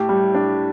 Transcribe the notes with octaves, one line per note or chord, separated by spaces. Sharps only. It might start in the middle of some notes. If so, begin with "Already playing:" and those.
Already playing: A2 G4
G3
D4